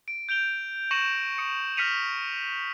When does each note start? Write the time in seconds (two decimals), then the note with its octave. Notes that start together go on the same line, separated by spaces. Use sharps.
0.08 D7
0.29 G6 D7 F7 G7
0.91 C#6 A#6 C#7 D#7 E7 F#7
1.38 D#6 C#7
1.77 F6 A#6 B6 C#7 D#7 F7